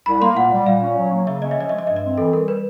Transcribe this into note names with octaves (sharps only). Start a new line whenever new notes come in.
C2 B5
A#3 C6
A#2 F#5
G3
A#2 F5
C#4
F#3
A#3
C#3 E5
C#4 D#5
E5
F3 D#5
G#3 E5
D#5
G2 E5
D#5
C4
E3 A4
G3 A#4
B4